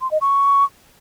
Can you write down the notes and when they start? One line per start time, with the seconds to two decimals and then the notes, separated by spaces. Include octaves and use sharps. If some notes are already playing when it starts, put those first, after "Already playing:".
0.01 C6
0.11 D#5
0.21 C#6